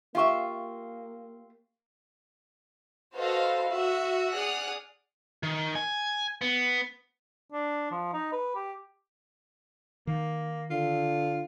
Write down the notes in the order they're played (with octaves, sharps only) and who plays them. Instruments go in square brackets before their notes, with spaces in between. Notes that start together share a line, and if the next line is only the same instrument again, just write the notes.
[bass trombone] A#3 [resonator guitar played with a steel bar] F4 G4 E5 [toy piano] F5 C#6
[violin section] F#4 A4 B4 C5 D#5 F5
F#4 E5
G#4 D5 F#5 D#6 F6 F#6
[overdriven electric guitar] D#3
G#5
B3
[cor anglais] D4
F3
D#4
B4
G4
[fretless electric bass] D#3 [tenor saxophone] A#3
[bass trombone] D3 [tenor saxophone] F4